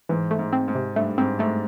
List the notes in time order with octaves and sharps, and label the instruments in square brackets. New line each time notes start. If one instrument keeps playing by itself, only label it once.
[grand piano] G#2 [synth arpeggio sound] E3
[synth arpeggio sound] A3
[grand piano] G#2
[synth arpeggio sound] C4
[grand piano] G#2
[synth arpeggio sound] C3
[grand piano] G2 [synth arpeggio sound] A3
[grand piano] G#2 [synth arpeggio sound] C4
[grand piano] G#2 [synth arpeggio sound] A3